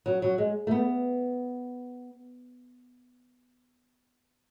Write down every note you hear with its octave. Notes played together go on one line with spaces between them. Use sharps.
F#3
F#3
G#3
A3
B3